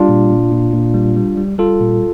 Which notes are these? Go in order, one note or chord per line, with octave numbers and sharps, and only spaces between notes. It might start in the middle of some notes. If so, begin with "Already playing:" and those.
Already playing: G3 D4 F4
A#2
A#2
A#2
A#2
G3
G3
G3
G3 F4 A4
A#2